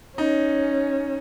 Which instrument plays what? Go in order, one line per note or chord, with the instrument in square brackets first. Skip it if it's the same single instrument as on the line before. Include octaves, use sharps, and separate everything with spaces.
[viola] C#4 [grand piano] D#4